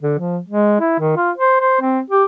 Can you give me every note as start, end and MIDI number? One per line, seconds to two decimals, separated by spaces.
0.01 0.16 50
0.19 0.39 53
0.49 0.79 56
0.80 0.98 64
0.99 1.14 51
1.16 1.31 65
1.38 1.58 72
1.61 1.80 72
1.81 2.00 60
2.10 2.24 67